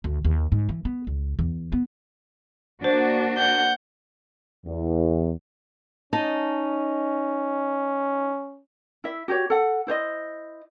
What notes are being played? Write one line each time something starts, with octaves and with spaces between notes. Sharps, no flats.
D2
D#2
G#2
E3
B3
C#2
E2
B3
A#3 D4 F#4 C5
F#5 G6
E2
C#4 D#4 D#5 A5
E4 E5
F#4 G4 C#5
A4 F#5
E4 C5 C#5 D#5